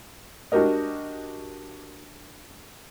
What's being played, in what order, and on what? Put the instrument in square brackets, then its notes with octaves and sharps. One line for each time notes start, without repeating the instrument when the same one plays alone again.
[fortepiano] D4 F#4 G4 A#4 D#5